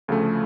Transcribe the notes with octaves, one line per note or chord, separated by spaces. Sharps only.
D2 C#3 F3 A3